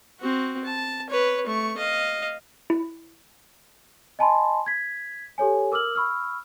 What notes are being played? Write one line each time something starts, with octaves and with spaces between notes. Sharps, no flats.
C4 F#4
A5
B4 C#5
A3 C#6
D#5 F5
E4
D#5 G#5 A5 B5 C6
G#6 B6
G4 A4 C#5 G#5
A#4 D6 E6 F6 F#7
B5 C#6 E6 F6